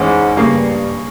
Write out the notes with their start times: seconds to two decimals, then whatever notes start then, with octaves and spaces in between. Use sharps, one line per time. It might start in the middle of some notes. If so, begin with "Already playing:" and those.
Already playing: E2 G#2 G#3 C#4
0.36 G2 C#3 G3 A#3